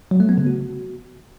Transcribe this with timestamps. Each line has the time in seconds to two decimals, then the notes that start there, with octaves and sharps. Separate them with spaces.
0.11 F#3
0.20 A3
0.29 B3
0.38 C#3
0.47 F#4